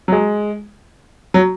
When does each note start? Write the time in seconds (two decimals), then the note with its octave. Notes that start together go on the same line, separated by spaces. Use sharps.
0.08 F#3
0.12 G#3
1.34 F#3